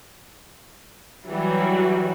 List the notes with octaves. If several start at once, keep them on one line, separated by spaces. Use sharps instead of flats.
E3 F#3 G3 F#4